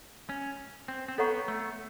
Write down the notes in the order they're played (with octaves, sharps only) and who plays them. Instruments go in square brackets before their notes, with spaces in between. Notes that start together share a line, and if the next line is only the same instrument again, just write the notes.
[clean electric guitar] C#4
C4
C4
[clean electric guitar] B3 [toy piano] A4 C#5 F#5 A#5 C#6
[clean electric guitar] A3